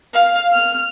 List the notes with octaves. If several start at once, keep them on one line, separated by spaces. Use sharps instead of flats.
F5
F6